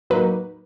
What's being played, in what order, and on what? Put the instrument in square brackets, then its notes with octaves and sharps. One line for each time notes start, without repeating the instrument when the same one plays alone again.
[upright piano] F#3 A#3 D#4 [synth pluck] B4